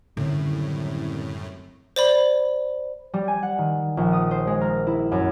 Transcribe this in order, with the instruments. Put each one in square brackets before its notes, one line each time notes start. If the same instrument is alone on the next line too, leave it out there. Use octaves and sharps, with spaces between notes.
[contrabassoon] C2 [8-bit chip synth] F#2 A2 [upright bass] D3 D#3
[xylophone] C5 D5 B5
[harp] G3
G#5
F#5
D#3
A#1
D#6
C5
G#3
A#4
E4
F#2